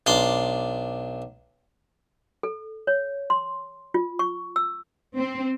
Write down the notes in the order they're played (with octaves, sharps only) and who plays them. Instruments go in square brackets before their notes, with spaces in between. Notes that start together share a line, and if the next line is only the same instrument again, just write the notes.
[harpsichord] B1 D4 C6 D6
[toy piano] A4
C#5
C6
F4
C#6
E6
[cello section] C4